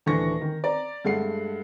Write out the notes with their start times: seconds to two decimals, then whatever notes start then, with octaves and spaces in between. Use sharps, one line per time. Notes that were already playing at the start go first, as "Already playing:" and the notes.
0.06 D#1 E3 A3 D4 C#6 A#6
0.41 D#3
0.64 D5 A#5
1.05 G2 G#3 A3 F#5 C7